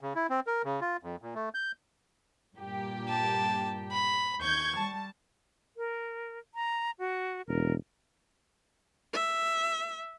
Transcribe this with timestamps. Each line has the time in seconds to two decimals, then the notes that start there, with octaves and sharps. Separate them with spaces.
0.01 C#3
0.15 E4
0.29 C4
0.47 A#4
0.64 C#3
0.81 F4
1.03 F2
1.22 A#2
1.35 A3
1.54 G6
2.59 G2 A#2 G4
3.09 A5
3.92 B5
4.42 D#2 C#6 G6 G#6
4.77 G3 A5
5.77 A#4
6.55 A#5
6.99 F#4
7.48 E1 A#4
9.13 E5